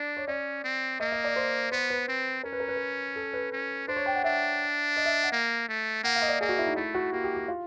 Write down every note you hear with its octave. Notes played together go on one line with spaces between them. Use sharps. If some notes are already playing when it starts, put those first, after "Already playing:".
Already playing: D4 D5
C#5
C#4 D5
C4
A#3 D#5
D#5
D5
C5
B3 C5
B4
C4
C#4 A#4
B4
A#4
B4
A#4
A4
B4
C#4
D4 C5
C#5
G5
F#5
D4 E5
D#5
E5
F#5
A#3
A3
A#3 F#5
F5
D#5
D5
A#3 G#4
F#4
E4
D#4
A3 E4
F#4
A#3 G4
G4
G4
F4